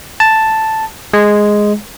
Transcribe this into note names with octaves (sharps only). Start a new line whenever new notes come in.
A5
G#3